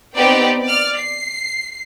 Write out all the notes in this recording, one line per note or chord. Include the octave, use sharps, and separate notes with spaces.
B3 C4 D#4 G4 D5 G5
D5 F6
C7